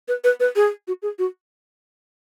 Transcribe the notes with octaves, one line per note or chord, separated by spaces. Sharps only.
B4
B4
B4
G#4
F#4
G#4
F#4